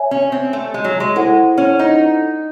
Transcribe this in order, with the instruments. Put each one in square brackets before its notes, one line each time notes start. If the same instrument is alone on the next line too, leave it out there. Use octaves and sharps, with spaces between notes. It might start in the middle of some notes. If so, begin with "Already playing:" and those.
Already playing: [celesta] C#5 E5 G#5
[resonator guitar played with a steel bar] C#4
C4
A3
G#3
F#3
G#3
[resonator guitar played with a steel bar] G#3 [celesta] E4 A4 C5 F#5
[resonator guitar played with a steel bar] C#4
D#4